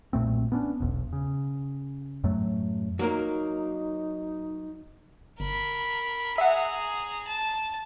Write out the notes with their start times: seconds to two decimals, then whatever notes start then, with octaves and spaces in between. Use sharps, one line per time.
0.13 B1 A#2 A3 C4
0.52 B3 C#4 D4
0.80 E1 B1
1.13 C#3
2.24 F#2 A2 F#3 A3
2.99 F#3 A#3 D#4 A#4
5.40 G1 A#4 B5
6.38 G#4 E5 F#5 A#5
7.28 A5